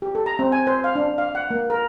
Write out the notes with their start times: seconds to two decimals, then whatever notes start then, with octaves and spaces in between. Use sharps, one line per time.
0.02 G4
0.15 A4
0.26 A#5
0.39 C4
0.52 G#5
0.67 C5
0.84 F5
0.95 D4
1.18 F5
1.35 F#5
1.51 A#3
1.70 A#4